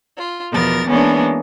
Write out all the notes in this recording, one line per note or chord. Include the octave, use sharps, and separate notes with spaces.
F4
E2 B2 F3 B3 A#4 A6
E3 G#3 A#3 B3 C#4 D4